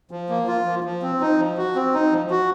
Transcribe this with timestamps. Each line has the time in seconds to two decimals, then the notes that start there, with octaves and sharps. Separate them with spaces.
0.11 F3
0.29 A#3
0.47 F4
0.65 F3
0.84 F3
1.02 C4
1.21 D#4
1.38 F3
1.57 F#4
1.75 C4
1.94 D#4
2.12 F3
2.30 F#4